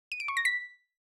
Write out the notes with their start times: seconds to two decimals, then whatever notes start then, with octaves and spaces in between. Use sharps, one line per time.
0.12 D#7
0.20 D7
0.28 C#6
0.37 A#6
0.45 B6